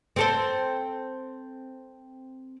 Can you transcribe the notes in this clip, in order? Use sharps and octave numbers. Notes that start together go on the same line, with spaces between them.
C4 A4 C5